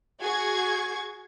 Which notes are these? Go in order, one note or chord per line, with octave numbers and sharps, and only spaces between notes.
F#4 G#4 C#6 G#6